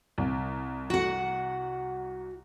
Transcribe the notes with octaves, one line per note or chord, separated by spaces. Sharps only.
C2
F#4 F#5